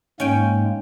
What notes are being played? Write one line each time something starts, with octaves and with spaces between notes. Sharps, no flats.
G#2 G#3 A#3 C#4 G5